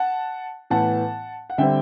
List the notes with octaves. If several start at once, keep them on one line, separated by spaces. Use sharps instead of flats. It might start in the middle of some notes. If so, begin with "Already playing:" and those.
Already playing: F#5 A5
A2 E3 B3 F#5 A5
F#5
D3 G3 C4 E5 G5